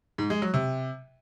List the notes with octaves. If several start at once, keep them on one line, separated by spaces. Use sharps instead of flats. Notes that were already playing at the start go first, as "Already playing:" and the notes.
G#2
G#3
F#3
C3